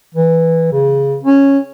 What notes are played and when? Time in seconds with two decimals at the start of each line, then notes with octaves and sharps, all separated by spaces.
0.14 E3
0.73 C#3
1.23 C#4